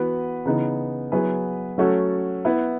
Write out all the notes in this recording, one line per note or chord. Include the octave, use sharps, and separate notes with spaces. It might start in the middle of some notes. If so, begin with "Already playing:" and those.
Already playing: E3 B3 F#4 B4
C#3 E3 B3 D#4
F#3 B3 E4 G#4 B4
F#3 A3 C#4 F#4 A4
B3 E4 B4